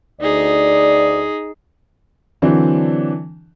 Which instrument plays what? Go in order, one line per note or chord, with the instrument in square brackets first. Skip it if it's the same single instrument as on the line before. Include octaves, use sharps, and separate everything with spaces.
[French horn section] D2 D5 [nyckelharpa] D#4 G#4
[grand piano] D3 E3 F#3 C4 D4